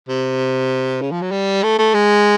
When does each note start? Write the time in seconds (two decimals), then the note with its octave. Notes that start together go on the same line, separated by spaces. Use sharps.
0.08 C3
1.02 C#3
1.12 F3
1.22 F#3
1.31 G3
1.63 A3
1.79 A3
1.94 G#3